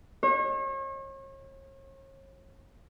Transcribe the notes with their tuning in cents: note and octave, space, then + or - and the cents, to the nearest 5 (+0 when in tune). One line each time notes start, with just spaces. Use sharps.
C#5 -40